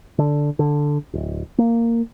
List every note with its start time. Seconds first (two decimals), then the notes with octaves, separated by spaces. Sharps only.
0.18 D3
0.59 D3
1.13 D1
1.58 A#3